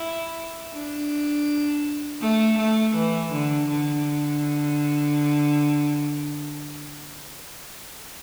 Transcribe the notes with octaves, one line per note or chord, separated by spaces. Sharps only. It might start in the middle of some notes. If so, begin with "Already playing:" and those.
Already playing: E4
D4
A3
A3
E3
D3
D3